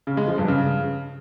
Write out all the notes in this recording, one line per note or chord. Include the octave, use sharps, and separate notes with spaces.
C#3
G#3
F3
G2
C#3